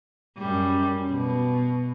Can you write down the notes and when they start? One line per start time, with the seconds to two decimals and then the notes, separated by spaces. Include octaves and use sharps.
0.38 F#2 G3
1.12 B2